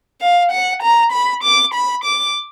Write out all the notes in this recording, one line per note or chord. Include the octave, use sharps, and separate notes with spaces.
F5
F#5
A#5
B5
D6
B5
D6